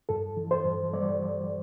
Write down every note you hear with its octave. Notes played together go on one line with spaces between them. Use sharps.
G2 A4
E3
C5
G2
G3 D5